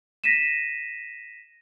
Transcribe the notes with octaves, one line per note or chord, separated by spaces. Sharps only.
A#6 B6 D#7 E7